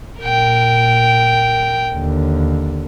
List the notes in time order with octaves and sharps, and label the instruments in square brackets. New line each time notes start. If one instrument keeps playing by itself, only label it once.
[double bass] A#2 [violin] A#4 G5
[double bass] D#2 D3